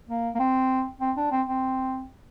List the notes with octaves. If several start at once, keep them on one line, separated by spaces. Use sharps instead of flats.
A#3
A#3
C4
C4
D4
C4
C4